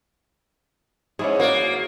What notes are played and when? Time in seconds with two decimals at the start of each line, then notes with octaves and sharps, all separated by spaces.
1.19 G#2 C#4 E4 G#4
1.40 A#3 F#4 D5